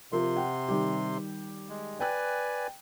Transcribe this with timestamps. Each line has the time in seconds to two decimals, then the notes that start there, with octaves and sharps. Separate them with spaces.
0.12 C3 F3 A#4 C6
0.36 F#5 G5
0.69 D#3 G3 G4
1.69 G#3
2.00 B4 D5 G5 G#5 F#6